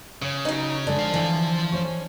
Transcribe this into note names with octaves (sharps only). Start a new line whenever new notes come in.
C#3 C#5
F#3 D#4
D3 G#3 D4
F3 F5
D3 E3
C#4 C5 C#5